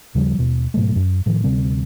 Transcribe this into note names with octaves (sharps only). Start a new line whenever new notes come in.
D#2 C#3 F3 G3
D#2 B2
G#2 B2 F#3 A3
F#2
A2 D#3 F3
D2 C3 G3 C4